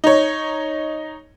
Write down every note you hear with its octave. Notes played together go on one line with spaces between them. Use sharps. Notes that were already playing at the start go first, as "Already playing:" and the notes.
D#4 C#5